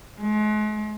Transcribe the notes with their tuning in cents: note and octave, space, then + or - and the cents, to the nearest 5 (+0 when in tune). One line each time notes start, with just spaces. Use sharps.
G#3 +40